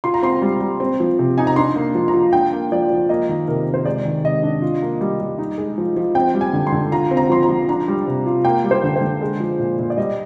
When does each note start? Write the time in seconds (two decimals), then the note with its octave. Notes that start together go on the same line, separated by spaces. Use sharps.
0.04 F4 C6
0.14 A#5
0.23 C4 C6
0.42 G3
0.61 G3
0.80 C4
1.00 F3
1.19 C3
1.38 D#4 G#5
1.47 A#5
1.56 D4 C6
1.76 A#3
1.95 F3
2.08 A#5
2.14 F4
2.33 D4 G5
2.52 A#3
2.72 F3 D5
2.90 F3
3.09 A#3 D#5
3.29 D#3
3.48 C3 A#4
3.68 C3
3.74 C5
3.86 G#3 D5
4.05 D#3
4.24 C3 D#5
4.43 D4
4.62 F4
4.82 A#3
5.01 G3
5.20 G3
5.38 D#4
5.58 G#3
5.78 F3
5.96 F3
6.15 C4 G5
6.34 G3
6.41 G#5
6.53 D3
6.67 C6
6.72 D3
6.92 F4 A#5
7.11 C4
7.17 A#5
7.30 F3 C6
7.43 A#5
7.49 F3
7.69 D4 A#5
7.88 G3
8.07 C3
8.26 F4
8.45 A#3 G5
8.64 G3
8.71 C5
8.84 D3
8.96 C5
9.02 D3
9.22 G#3
9.40 F3
9.59 A#2
9.79 A#2
9.90 D5
9.97 G3 D#5